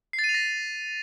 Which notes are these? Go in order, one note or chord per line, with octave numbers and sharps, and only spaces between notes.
C7
A6
D#7
F7
A#6